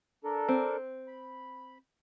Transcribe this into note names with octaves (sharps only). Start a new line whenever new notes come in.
D4 A4 A#4
C4
B5